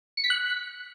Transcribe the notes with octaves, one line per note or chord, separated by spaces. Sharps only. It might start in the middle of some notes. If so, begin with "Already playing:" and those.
C#7
B6
F#6